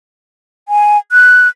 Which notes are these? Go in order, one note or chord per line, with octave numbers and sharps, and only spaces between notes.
G#5
F#6